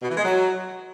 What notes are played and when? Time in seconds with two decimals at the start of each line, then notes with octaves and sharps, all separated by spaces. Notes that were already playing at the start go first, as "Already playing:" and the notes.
0.02 B2
0.10 E3
0.17 G#3
0.25 F#3